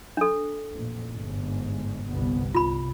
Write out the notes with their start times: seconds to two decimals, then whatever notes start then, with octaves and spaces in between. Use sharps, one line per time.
0.17 D4 A4
0.73 A1 F2 A#2
1.12 G1 G#2
2.09 G1 C2 B3
2.55 C2 F4 B5